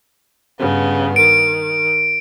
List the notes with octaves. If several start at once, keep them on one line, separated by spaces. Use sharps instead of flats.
G2 C#3 B3
D#3 D7